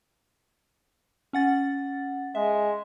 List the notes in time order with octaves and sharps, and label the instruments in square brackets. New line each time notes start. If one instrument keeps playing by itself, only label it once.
[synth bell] C#4 F#5 A6
[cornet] G#3 [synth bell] E5